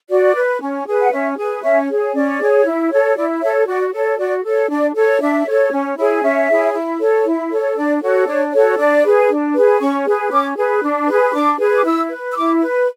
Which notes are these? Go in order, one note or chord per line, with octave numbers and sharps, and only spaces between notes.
F#4 D5
B4
C#4
G#4 B4
F#5
C#4 E5
G#4 B4
C#4 E5
G#4 C#5
C#4 D5
G#4 C#5
E4
A4 C#5
E4 D5
A4 C#5 E5
F#4 D5
A4 C#5
F#4 D5
A4 C#5
D4 D5
A4 C#5
D4 E5
A4 C#5
C#4
E4 G#4 C#5
C#4 E5
E4 G#4 C#5
E4
A4 C#5
E4
A4 C#5
D4 D5
F#4 A4 C#5
D4 C#5
F#4 A4 C#5
D4 D5
G#4 B4
D4
G#4 B4
C#4 C#6
G#4 B4
C#4 D6
G#4 B4
D4
G#4 B4
D4 D6
G#4 B4
D6
E4 E6
B4
E6
E4 D6
B4